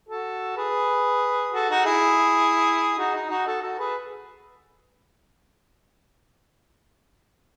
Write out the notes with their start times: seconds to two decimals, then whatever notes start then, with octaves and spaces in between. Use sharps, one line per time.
0.09 F#4 A4
0.57 G#4 B4
1.53 F#4 A4
1.70 D#4 F#4
1.85 E4 G#4
2.98 D#4 F#4
3.15 D#4
3.30 D#4 F#4
3.47 F#4 A4
3.62 F#4 A4
3.79 G#4 B4